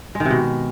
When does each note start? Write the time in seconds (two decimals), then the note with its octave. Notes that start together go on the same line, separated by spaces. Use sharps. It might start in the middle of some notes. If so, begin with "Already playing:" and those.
0.15 G#3
0.20 D#3
0.25 C3
0.30 B2